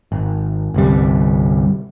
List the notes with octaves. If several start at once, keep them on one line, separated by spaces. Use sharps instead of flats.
G#1
G1 C2 G3